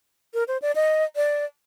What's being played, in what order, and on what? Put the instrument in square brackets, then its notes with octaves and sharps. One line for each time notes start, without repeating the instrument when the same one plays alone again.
[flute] A#4
C5
D5
D#5
D5